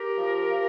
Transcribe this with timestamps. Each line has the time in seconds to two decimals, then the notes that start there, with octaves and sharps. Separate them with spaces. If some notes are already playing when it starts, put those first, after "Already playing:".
Already playing: G4 A#4
0.18 F3
0.49 F3